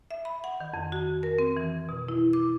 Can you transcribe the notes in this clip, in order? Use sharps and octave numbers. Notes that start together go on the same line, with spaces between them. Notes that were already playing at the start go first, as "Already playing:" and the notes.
E5
B5
F#5
D#3
F2
F#4
A#4
C4
E3
B2
E4
D6